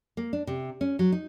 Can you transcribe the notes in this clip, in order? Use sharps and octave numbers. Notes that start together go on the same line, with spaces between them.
A#3
D4
C3
C#4
F#3
D#4